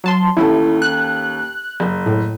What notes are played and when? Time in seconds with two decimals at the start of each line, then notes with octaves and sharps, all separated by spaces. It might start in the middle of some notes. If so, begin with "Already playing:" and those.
0.04 F#3 A5 C6
0.37 D#2 C#4 E4 A4
0.82 F#6
1.80 F#1
2.06 A2